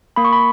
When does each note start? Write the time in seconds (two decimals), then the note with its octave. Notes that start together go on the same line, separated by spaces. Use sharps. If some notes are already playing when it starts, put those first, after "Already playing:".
0.16 A#3 B5
0.25 C#6
0.33 B5